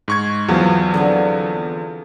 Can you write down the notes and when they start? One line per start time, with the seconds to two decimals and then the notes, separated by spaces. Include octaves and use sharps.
0.08 G#2 C#6 G#6
0.49 E2 F3 F#3 B3
0.94 D3 C4 G#5